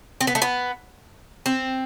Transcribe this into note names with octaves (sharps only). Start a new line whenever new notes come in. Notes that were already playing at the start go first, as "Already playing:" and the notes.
C4
B3
A3
B3
C4